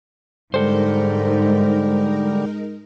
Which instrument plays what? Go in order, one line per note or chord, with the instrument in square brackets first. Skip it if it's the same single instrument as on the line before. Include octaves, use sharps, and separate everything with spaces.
[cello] G#2 [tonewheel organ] D3 G3 [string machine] G#3 D#4 A#4 [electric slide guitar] A4 C5